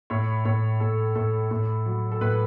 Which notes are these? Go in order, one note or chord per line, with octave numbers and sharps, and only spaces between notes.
A2 C#5
A2 C#5
A2 A4
A2 A4
A2
F#3
A4
A2 B4